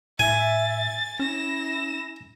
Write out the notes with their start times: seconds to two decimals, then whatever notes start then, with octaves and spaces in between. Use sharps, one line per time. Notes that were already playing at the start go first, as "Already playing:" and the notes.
0.19 A2 E5 G#5 A6
1.20 C#4 E4 A#6 E7